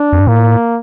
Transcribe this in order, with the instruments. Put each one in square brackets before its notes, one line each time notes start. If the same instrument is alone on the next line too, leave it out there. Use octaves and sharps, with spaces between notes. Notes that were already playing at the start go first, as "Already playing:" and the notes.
Already playing: [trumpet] D4
[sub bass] F2
G2
[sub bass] A2 [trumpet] A#3